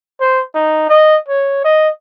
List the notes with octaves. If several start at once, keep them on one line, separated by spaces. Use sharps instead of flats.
C5
D#4
D#5
C#5
D#5